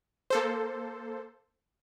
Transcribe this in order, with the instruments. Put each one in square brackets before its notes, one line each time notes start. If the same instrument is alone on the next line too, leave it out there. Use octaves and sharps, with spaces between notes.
[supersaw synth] A#3 A4 C5